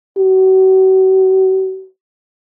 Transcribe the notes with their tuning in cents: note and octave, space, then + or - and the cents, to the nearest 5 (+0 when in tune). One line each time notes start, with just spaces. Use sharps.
F#4 +40